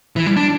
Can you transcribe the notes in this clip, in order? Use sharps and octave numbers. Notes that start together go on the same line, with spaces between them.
E3
G3
D4